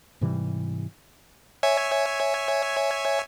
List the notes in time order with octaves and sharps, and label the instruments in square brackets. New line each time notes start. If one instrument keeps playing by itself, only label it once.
[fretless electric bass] G#2 C3 E3 G3
[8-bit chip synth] C#5 E5 G#5